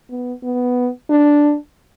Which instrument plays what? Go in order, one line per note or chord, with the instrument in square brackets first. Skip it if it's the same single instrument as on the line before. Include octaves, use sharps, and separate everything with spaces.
[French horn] B3
B3
D4